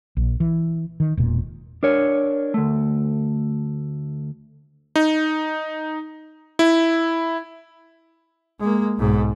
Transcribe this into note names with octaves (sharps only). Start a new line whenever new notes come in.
A#1
E3
D#3
E1 A#2
D4 A#4 C#5
D2 A3
D#4
E4
G#3 A#3
B1 G#2